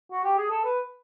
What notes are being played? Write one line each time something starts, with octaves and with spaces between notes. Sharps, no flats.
F#4
G4
G#4
A4
B4